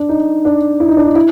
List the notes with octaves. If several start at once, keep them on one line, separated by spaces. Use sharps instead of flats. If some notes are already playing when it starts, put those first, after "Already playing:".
Already playing: D4
D#4
D4
E4
D#4
D4
D#4
E4